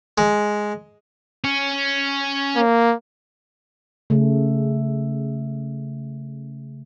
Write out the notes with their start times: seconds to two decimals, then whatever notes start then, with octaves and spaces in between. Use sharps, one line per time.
0.18 G#3
1.44 C#4
2.56 A#3
4.10 C#3 A3